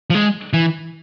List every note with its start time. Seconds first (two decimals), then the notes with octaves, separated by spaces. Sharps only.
0.10 F3
0.15 G#3
0.53 E3